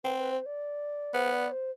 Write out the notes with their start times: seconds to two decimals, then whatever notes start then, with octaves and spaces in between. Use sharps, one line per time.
0.04 C4 B4
0.18 B4
0.31 C5
0.45 D5
1.14 B3 C5
1.32 D5
1.51 C5